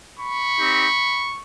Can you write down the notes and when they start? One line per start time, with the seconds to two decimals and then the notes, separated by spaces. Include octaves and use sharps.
0.19 B5 C#6
0.58 C4 D#4 G4